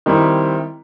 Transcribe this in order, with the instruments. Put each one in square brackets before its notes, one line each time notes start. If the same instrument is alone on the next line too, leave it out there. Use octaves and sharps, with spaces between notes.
[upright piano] D#3 G3 C4 E4